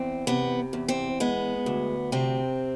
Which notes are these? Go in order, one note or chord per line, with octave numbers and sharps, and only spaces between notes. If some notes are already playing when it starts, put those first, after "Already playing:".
Already playing: E2 C4
C3 B3
E2
C4
G#3 B3
D2
C3 C4